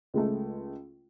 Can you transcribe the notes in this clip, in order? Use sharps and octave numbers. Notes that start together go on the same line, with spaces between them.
C#2 G#3 A3